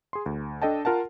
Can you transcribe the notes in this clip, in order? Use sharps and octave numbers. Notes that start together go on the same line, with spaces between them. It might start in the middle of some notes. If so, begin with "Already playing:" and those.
G#4 C6
D2
D4 A4 D#5 G5 A5
F4 A#4 F#5 A5